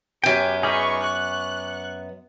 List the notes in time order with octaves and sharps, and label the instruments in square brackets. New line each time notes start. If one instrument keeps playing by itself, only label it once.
[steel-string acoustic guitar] F#2 B3 [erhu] G4 [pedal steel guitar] G5 G#5
[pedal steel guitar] D#4 G#4 B4 [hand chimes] G#5 D6 F6 [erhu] C#6
[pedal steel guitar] C#6 [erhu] F#6